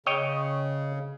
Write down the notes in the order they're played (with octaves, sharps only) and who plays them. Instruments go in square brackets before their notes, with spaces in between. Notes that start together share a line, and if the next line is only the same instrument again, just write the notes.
[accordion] C#3 [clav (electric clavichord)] C#5 D#5 G5